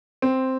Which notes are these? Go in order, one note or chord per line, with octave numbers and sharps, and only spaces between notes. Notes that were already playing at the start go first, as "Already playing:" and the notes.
C4